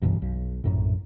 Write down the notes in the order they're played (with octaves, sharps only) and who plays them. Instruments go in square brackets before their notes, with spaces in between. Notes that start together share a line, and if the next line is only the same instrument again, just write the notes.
[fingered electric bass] F#1 B1 G2 E3
B1
A#1 F#2 A2